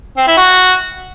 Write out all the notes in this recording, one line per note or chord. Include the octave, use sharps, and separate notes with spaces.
C4
E4
F#4